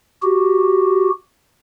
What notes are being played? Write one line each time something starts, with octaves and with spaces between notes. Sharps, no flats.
F#4 G4